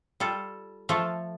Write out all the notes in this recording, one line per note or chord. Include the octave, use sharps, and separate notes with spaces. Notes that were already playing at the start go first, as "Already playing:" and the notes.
G3 F4 A4
F3 A3 F4 A4